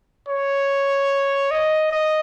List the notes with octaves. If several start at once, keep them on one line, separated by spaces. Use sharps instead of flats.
C#5
D#5
D#5